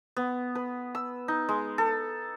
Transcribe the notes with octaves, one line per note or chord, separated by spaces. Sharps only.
B3
B4
E6
D#4
G#3
A4